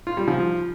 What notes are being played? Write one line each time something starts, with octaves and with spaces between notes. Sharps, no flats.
F4
G3
F3